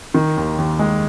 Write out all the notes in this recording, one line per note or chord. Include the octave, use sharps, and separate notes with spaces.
D#3
D#2
D#2
G#3